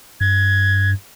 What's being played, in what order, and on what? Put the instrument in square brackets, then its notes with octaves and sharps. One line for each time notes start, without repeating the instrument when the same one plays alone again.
[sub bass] G2 [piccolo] G#6